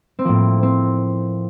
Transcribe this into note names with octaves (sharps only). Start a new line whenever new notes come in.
C4
A2 F3 A#3
C4